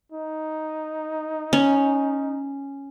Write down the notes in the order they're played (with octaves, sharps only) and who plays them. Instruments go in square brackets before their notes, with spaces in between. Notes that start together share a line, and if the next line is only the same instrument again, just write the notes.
[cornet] D#4
[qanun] C#4